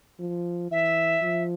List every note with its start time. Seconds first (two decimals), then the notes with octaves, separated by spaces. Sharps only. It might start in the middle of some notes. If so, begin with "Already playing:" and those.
0.20 F3
0.71 E3 E5
1.23 F3